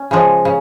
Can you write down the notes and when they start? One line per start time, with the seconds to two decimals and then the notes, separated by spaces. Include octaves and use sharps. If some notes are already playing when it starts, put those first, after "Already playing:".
Already playing: C#4
0.11 C#3 F3 G#3
0.45 C#3